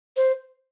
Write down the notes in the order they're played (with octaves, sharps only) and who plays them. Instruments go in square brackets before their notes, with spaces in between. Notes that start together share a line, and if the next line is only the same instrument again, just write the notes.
[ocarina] C5